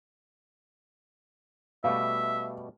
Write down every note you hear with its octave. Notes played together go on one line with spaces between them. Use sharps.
B2 G3 A3 E5 F5